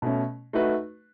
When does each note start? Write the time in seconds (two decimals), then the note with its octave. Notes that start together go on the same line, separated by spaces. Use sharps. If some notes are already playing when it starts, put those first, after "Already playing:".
0.02 B2 A3 C#4
0.53 A3 D#4 F#4 B4